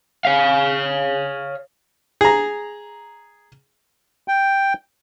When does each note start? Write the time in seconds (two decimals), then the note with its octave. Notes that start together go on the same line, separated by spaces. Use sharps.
0.25 C#5 F5
2.21 G#4 A#5
4.28 G5